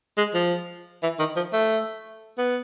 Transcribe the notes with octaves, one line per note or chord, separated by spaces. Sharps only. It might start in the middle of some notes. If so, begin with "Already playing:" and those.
G#3
F3
E3
D#3
F3
A3
B3